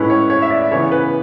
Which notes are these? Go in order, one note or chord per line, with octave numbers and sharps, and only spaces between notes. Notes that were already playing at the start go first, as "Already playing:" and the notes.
Already playing: A2 G#3 C#4 E4 B4
C#5
C#5
E5
D5
C#3 E3 B3 C#5
B4